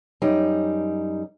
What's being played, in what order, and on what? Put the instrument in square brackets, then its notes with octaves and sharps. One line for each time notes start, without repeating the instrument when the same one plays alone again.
[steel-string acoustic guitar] F#2 G3 D#4